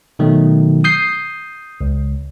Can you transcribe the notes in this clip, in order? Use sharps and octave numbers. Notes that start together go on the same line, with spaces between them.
B2 D#3 F#3 A3
D#6 G6 C7
C#2